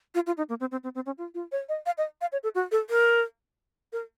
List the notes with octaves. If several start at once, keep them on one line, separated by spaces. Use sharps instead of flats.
F4
F4
D#4
A#3
C4
C4
C4
C4
C#4
F4
F4
C#5
D#5
F5
D#5
F5
C#5
A4
F#4
A4
A#4
A#4